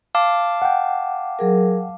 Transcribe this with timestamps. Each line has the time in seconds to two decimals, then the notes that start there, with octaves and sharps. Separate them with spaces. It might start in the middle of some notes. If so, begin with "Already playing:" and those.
0.15 F5 A5 D6
0.62 F#5 G5
1.39 F#3 G#4 A#4